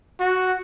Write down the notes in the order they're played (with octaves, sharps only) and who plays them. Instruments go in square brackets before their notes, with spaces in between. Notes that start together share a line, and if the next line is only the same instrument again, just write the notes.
[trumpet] F#4